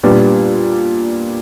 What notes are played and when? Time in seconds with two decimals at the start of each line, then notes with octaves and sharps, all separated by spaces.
0.03 A#2 G3 B3 D4